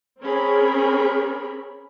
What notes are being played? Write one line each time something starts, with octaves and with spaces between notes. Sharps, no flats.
C4 C#4 G#4 A#4 B5